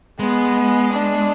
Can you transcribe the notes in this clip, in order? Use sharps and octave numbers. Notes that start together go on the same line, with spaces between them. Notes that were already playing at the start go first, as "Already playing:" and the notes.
G#3 B3
D4